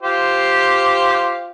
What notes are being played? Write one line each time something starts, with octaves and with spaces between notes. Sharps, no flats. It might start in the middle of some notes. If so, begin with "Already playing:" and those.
F4 G4 C5